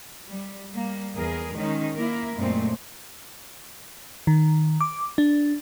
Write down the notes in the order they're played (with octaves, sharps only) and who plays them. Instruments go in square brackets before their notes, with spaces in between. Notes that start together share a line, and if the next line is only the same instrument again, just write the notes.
[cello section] G3
G3 A#3
E2 G#4 A#4
D#3 G#3 C#4 D#4
A#3 E4 A#4
F#2 A#2 G#3 A3 C4
[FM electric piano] D#3
D6
D4